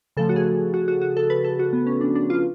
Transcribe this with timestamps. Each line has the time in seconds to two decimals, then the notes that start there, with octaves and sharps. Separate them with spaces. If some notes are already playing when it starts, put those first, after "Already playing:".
0.17 C#3 F3 A3 A4
0.29 F#4
0.36 G#4
0.74 F#4
0.88 F#4
1.02 F#4
1.17 A4
1.30 B4
1.44 A4
1.59 F#4
1.73 B3
1.87 C#4
2.01 D4
2.15 D4
2.30 F4